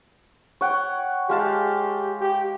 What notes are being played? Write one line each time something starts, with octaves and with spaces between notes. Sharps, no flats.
C#5 F#5 G5
G#3 G4 F5 A5
G4